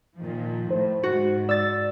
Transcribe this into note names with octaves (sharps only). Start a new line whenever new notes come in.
A#2 D#3 F3
A2 C5
G#2 F#4
D5 E6 A6